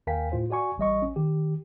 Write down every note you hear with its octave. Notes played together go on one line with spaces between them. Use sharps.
D#2 A#4 F5 G5 G#5 B6
A2 F4 C5
F#4 D5 G#5 C#6
A1 G3 D#5 C#6
C#4
D#3 G4